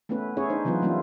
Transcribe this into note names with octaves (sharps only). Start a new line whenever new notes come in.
A3 B3 C#4 E4 B4
C#4 E4 G#4 C#5
D4 D#4 C5
C#3 E3 F#3 B3 F4 B4
E3 G3 A#3 C#4 E4 F4